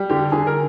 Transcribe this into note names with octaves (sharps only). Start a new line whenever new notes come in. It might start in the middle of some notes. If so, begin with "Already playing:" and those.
Already playing: G3
D3 G4
D3 G#4
A#4